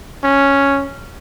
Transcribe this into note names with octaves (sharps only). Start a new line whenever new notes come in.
C#4